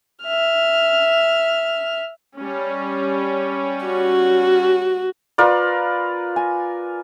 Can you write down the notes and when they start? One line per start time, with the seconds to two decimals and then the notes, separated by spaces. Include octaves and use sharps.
0.25 E5 F6
2.36 G3 C#4
3.85 F#4
5.38 F4 A#4 B4 D5
6.36 G#5